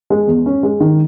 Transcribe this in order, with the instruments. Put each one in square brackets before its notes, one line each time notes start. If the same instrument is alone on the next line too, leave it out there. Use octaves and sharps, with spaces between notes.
[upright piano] G#3
E2
C#4
G#3
D#3